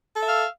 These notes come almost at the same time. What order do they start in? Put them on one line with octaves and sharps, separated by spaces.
A4 E5 F5